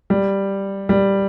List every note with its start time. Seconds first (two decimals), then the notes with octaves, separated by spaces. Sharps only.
0.10 G3
0.89 G3